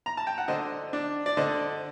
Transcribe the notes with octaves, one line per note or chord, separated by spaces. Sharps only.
A#5
A5
G5
F#5
D3 C5 D#5
D4
D5
D3 C5 D#5